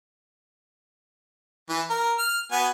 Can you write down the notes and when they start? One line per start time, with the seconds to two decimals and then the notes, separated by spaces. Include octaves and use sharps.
1.69 E3
1.90 A#4
2.18 F6
2.52 B3 F#4 G#5